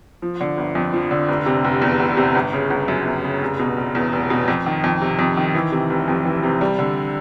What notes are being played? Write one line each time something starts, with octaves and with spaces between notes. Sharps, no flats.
F3
D3
G1
F2
F3
D3
F1
C3
F1
E2
F1
C3
G1
C#3
G1
F#2
G1
C#3
F1
B2
F1
E2
F1
B2
F2
D#3
F2
C3
F2
D#3
E3
C3
F1
F2
E3
C3
G3
D3